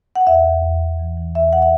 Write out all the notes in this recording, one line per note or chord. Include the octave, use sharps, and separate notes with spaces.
F#5
E2 E5
E2
E2
E2
E3
E3
E2 E5
F#5
E5